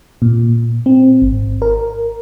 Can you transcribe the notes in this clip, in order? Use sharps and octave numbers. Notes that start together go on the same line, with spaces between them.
A#2
C4
G#1
A#4